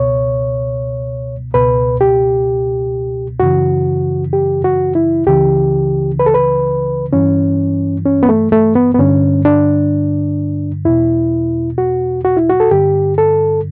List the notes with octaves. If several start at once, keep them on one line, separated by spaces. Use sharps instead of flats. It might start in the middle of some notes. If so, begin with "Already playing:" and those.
Already playing: C#2 B2 C#5
C#2 B2 B4
G4
F#2 C#3 E3 F#4
G4
F#4
E4
C#2 C#3 E3 G4
B4
A4
B4
G2 E3 C#4
C#4
B3
A3
A3
B3
B3
G2 D3 C#4
D4
E2 B2 E4
F#4
F#4
E4
F#4
A4
G2 D3 G4
A4